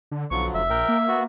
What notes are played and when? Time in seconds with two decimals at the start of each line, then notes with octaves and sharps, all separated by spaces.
0.11 D3
0.31 B1 D3 F3 F#3 C#6
0.54 F1 E5
0.70 A#1 A#4 G5
0.89 A#3
1.08 B3 F#4